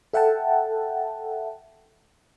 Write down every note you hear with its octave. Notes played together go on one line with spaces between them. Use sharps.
A4 E5 F#5 G5 A5